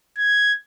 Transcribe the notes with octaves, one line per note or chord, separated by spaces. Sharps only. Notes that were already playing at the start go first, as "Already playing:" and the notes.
G#6